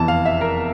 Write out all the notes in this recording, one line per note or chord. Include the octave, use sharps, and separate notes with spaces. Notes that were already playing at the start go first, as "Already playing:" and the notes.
Already playing: F1 E2 E3 A5
F5
E5
A#4